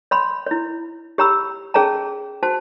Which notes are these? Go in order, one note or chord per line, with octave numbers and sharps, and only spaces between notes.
C#5 B5 C6
E4 C#5
G4 C#5 A#5 B5 E6
C#4 G#4 C#5 A5 A#5
F#4 C5 A5